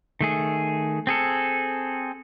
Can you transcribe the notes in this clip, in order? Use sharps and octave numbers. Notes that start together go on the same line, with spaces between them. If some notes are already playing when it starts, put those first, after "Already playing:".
D#3 A3 G#4
C4 G#4 A4